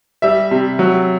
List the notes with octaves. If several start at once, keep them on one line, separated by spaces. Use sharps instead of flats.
G3 E5
C3
F#3